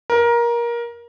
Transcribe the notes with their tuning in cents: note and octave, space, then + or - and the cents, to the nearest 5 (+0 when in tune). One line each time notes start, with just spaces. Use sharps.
A#4 +20